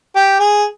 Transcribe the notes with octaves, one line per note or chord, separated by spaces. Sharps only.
G4
G#4